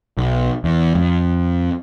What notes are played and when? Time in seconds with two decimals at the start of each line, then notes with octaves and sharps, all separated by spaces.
0.17 B1
0.64 E2
0.95 F2